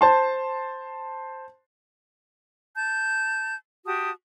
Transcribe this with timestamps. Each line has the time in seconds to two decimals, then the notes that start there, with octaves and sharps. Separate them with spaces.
0.01 C5 A5 C6
2.75 A5 G6
3.86 F#4 G4 A5 D#6